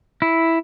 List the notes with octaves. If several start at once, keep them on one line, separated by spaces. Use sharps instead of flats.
E4